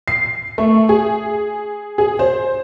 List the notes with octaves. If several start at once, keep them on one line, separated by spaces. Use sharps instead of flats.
C7
A3
G#4
G#4
C5